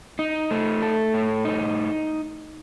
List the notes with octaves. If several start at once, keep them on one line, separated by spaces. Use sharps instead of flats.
D#4
A3
A4
A2
D#4